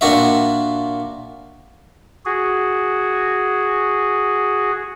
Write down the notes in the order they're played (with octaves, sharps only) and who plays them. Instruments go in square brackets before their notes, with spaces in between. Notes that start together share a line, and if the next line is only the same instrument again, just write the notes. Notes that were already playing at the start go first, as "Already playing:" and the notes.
[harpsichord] A#2 D4 F#4 E5
[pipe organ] F#4 G#4